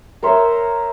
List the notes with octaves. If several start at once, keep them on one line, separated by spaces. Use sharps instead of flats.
A#4 C5 C#5 E5